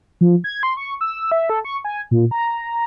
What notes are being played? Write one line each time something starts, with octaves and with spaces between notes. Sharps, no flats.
F3
G#6
C6
C#6
E6
E5
A4
C#6
G#5
A#2
A#5